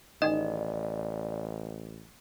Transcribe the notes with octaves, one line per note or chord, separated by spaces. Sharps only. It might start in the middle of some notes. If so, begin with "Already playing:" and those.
A1 D#3 G#4 D5 D#5